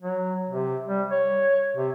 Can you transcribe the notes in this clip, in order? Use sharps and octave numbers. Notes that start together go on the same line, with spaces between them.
F#3
C3
G3
C#5
C3